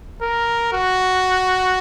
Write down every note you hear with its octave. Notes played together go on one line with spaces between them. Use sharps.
A#4
F#4